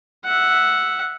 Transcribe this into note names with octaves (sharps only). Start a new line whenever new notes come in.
E5 F#5